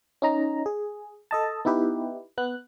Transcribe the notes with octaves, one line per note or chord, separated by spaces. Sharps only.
C#4 D#4 A#5
G#4
A4 D#5 A5
B3 D#4 E4 G4 B4
B3 F#6